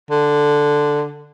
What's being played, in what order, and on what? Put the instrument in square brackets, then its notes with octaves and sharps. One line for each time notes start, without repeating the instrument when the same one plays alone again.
[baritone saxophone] D3